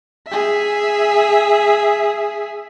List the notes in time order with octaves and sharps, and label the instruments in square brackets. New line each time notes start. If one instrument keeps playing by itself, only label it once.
[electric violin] G#4 E5